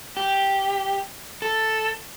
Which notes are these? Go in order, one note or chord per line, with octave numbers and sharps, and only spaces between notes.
G4
A4